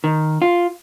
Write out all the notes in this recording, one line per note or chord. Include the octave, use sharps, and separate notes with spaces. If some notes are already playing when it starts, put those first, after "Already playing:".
D#3
F4